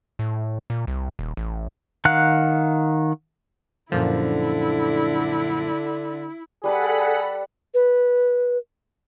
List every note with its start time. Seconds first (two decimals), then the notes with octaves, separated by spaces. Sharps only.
0.19 A2
0.70 A#2
0.87 C2
1.19 D#1
1.37 A1
2.05 D#3 F5 F#5 F#6
3.92 F#2 A#2 D3 F3 E4
6.64 G3 G#4 A4 B4 F#5 A5 B5
7.74 B4